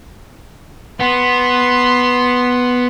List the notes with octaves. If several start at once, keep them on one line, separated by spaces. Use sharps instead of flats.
B3 C6